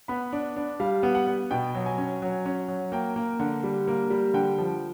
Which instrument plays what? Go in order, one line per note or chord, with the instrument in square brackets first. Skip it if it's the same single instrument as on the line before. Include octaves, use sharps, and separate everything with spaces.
[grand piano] B3 B5
D4
D4
G3 F5
B3
F#5
B3
B2 G5
F#3
G#5
C#4
F#3
C#4
F#3
A#3 G5
A#3
D3
G3
A#3
G3
D3 G5
F3